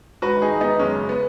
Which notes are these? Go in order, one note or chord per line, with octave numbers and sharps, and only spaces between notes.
G#2 F#4 B4
D#3
D#4 G#4
G#2
D#3 B3 D#4
F#2 G#3 C#4
C#3
B3